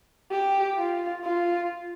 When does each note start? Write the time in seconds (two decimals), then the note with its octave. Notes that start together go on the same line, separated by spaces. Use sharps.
0.31 G4
0.77 F4
1.24 F4